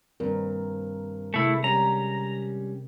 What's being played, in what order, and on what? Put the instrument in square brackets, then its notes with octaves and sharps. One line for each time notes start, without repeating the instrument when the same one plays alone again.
[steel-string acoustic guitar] G2 [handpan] D#3 C4 A#4
[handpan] C3 G#3 [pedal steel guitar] A3 E4
[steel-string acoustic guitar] G3 C#4 [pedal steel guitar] A#5